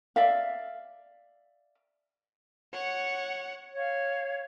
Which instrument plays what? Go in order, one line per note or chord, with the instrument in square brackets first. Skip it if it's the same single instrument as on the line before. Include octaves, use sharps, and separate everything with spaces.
[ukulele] D5 E5 F5
[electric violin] C#5 F#5
[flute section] C#5 F5